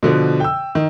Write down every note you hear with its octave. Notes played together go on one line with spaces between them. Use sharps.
B2 D3 F3
G5 E6
D#3